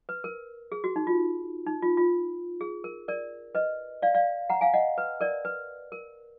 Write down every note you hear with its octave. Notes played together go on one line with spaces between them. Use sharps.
B4
A#4
G#4
F#4
D#4
F4
D#4
F4
F4
G#4
A#4
A#4 D5
B4 D#5
D5 F5
D5 F5
F#5 A#5
F5 G#5
D#5 F#5
B4
A#4 D5
B4
A#4